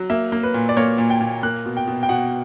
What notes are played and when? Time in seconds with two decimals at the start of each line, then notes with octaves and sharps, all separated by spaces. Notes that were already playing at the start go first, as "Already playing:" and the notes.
Already playing: F#3
0.10 A#3 E5
0.32 A#3
0.43 B4
0.54 A#2
0.69 D5
0.77 A#3 C#5
0.98 A#2
1.10 G5
1.21 A#2
1.43 A#3 F#6
1.66 B2
1.77 G5
1.87 B2
2.03 G5
2.09 B2 F#5